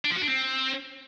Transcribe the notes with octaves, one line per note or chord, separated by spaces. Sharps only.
D4
F3
F#4
D4
C4